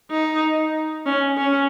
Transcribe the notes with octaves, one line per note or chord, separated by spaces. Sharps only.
D#4
C#4
C#4